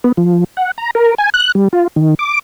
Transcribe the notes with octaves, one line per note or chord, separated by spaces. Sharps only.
B3
F3
F#5
A#5
A#4
G#5
F#6
G3
F4
D#3
D6